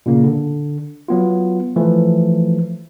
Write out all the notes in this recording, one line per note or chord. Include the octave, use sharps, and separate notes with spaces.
A#2 C#3 A#3
D3
F#3 B3 F4
E3 F3 A3